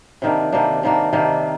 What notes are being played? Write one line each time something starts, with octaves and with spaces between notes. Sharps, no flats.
C3 D#3 A#3 D4
C3 D#3 A#3 D4
C3 D#3 A#3 D4
C3 D#3 A#3 D4